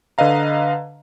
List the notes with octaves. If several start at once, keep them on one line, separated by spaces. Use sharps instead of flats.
D3 B4 D#5 F5 A#5